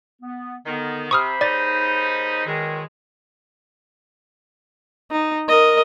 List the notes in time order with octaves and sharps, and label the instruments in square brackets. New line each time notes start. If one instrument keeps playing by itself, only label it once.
[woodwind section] B3
[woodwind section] D3 B3 [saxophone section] D#3
[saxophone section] C3 [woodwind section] C5 B5 [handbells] C#6 D#6 F6
[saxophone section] D#2 C#3 D#4 [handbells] D5 A6
[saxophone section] E2 F#3 G#3 [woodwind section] D#3
[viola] D#4
A#4 D#5